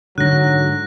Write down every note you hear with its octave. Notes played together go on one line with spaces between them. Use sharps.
G#2 D3 F#3 F#6 A#6